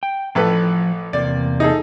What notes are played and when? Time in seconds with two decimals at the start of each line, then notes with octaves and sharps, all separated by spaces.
0.03 G5
0.35 A1 F3 A4 B4
1.13 E2 C3 A#3 D5
1.60 D#4 G#4 A4